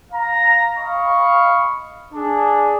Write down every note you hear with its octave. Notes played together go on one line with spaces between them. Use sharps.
F5 A#5
D#5 F5 B5 C#6
D4 G#4